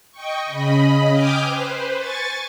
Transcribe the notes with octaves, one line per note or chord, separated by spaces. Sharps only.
D#5 G5 C#6
C#3 D#5 B5
G5 G#5 D6 D#6 F6 G6
B4 C5
G#5 C#6 A6